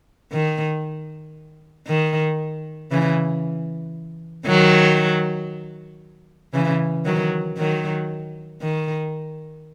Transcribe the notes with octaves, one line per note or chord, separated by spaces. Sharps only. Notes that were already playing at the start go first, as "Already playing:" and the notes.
D#3
D#3
C#3 E3
D#3 F#3
C#3 E3
D#3 F#3
D#3 F#3
D#3